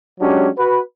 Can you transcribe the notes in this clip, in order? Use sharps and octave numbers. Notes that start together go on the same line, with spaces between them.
F#3 G#3 C#4 D4 G4
F#4 B4